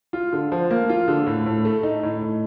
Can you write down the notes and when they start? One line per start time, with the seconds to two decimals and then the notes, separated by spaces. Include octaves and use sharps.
0.13 F4
0.33 D3
0.52 F3
0.70 A#3
0.89 F4
1.08 D3
1.26 A2
1.46 A2
1.65 A3
1.83 D#4
2.03 A2
2.22 A2